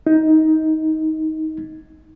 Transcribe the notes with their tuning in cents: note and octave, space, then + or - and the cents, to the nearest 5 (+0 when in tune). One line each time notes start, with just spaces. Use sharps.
D#4 +15